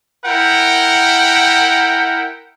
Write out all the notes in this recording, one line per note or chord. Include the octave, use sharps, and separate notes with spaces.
E4 A#4 F#5 G5